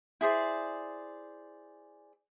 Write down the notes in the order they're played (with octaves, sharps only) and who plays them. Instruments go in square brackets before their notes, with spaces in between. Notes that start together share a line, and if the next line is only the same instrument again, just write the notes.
[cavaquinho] E4 G#4 C5 D5